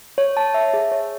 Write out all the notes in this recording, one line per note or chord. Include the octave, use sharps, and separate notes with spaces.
C#5
A5
E5
G#4
C#5